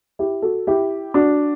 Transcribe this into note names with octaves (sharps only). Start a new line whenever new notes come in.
E4 G4
F#4 A4
E4 G4
D4 F#4